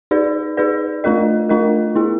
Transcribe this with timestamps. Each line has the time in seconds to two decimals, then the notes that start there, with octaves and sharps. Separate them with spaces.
0.11 D#4 G#4 B4 D5
0.57 D#4 G#4 B4 D5
1.04 A3 D4 F4 A#4 D#5
1.49 A3 D4 F4 A#4 D#5
1.95 B3 E4 G#4